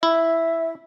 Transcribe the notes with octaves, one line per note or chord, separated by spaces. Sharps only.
E4 E5